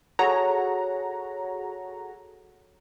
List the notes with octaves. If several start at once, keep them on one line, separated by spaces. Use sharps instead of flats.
F#4 G#4 A4 C#5 F#5 A#5